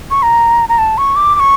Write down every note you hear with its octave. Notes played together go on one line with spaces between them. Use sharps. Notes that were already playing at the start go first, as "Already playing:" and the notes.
C#6
A#5
A#5
A5
C#6
D6
D6
C#6